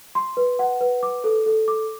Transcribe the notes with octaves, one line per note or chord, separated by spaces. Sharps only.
C6
B4
F#5
B4
D6
A4
A4
D6